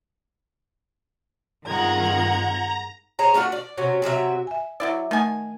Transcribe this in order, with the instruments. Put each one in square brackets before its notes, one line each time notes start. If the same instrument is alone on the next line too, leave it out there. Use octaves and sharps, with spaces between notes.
[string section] G2 D#3 G#3 [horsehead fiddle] C4 F4 [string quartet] F#5 G#6 [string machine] A#5
[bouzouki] G#4 C5 C#5 A#5
A3 D4 F4 F#4
D5
C3 F#3 C#4
C3 F#3 G4 E5
[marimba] E5 G#5
[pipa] F#3 E4 D5 [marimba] E6
[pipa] D#3 G#5 [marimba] A3 F#5 D#6